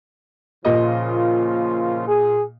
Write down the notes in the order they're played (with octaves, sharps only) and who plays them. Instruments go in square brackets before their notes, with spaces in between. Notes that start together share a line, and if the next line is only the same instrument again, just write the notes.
[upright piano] A#2 D#5 [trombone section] C#3 F3 F4
[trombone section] G#4